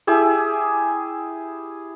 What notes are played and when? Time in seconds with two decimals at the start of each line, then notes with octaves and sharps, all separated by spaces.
0.07 E4 G4 G#4 E5